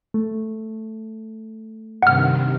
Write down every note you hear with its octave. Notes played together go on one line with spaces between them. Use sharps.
A3
G2 C3 D#3 F#5 F6